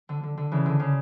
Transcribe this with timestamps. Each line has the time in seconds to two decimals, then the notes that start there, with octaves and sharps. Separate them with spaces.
0.09 D3
0.23 D3
0.37 D3
0.52 C#3 E3
0.66 D3
0.80 C#3